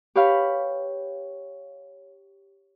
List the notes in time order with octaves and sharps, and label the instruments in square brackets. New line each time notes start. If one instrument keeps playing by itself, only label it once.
[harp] G4 B4 C#5 F5